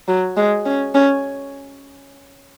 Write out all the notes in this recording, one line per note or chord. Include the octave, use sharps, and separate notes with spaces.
F#3
G#3
C#4
C#4